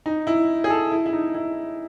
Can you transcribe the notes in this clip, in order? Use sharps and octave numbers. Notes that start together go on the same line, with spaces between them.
D#4
E4
G#4
A4
E4
E4
D#4
E4